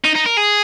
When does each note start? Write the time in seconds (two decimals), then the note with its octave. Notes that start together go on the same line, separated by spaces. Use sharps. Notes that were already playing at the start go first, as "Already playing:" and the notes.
0.05 D#4
0.15 D#4
0.26 A#4
0.37 G#4